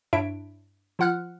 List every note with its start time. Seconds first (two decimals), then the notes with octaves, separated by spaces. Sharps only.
0.13 G2 D4 E4 C#5 E5 D7
0.99 F3 F4 F#5 F6 F#6